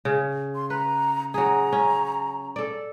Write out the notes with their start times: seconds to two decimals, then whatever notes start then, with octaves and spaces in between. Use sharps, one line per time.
0.05 C#3
0.55 C6
0.70 B4 A#5
1.34 F#3 G#4 A#5
1.73 C#4
2.56 A4 D5